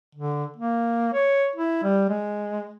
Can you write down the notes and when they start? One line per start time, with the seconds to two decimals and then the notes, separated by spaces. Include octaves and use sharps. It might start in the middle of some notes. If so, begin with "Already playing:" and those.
0.15 D3
0.57 A#3
1.13 C#5
1.56 E4
1.83 G3
2.09 G#3